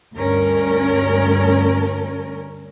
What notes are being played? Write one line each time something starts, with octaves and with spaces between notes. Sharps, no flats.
D2 G2 C#4 A#4